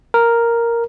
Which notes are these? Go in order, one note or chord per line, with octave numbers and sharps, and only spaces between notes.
A#4